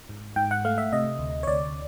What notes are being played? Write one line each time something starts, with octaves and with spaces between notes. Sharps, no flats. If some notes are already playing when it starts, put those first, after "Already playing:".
G#2
G#2 G5
F#5
A3 F5
E5
C3 D#5
D2
C#5
D2 D5